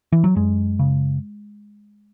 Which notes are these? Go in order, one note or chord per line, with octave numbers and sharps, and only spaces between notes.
E3
F#3
F#2 G#3
C#3